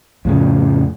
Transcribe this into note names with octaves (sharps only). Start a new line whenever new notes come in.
F2 A2 C#3